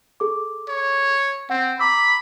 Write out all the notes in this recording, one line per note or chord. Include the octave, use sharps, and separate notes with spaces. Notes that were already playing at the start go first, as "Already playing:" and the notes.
G#4 A4 D6
C#5
C4 F#5
A#5 B5 D6 E6